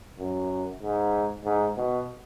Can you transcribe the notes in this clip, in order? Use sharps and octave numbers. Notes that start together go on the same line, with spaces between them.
F#2
G#2
G#2
B2